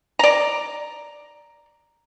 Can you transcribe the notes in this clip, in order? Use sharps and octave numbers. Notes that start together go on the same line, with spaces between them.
D5 A#5